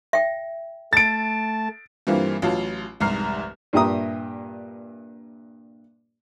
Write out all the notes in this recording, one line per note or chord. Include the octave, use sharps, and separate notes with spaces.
E5 G5
A3 A5 A6 D7
G2 E3 G3 A#3 C4 F4
A1 F#3 F4 A5
F1 C2 G#2 A#5 F6 C7
G2 A#2 G4 E5 A#5 D#6